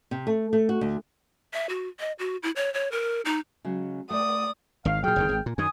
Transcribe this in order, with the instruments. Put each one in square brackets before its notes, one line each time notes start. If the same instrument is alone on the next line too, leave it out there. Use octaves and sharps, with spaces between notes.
[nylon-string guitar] C3
A3
A3
F#4
D2
[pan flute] E5
F#4
D#5
F#4
E4
C#5
C#5
A#4
D#4
[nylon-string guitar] C#3 F#3 G#3
[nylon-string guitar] A3 [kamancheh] D5 D#6
[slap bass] G#1 D#3 [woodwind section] F5
[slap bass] A#2 F#3 [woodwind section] G#4 G5 F6
[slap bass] F#1 E2 D#3
G#1
A#2
[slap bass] F#2 D#3 [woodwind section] G#5 D#6